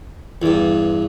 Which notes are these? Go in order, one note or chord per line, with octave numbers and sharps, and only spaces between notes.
E2 G2